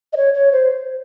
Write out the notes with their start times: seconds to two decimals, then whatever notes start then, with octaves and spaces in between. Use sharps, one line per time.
0.13 D#5
0.17 C#5
0.34 C#5
0.52 C5